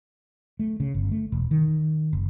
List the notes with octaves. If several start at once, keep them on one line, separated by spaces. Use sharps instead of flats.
A3
C#3
G1
A3
E1
D#3
F#1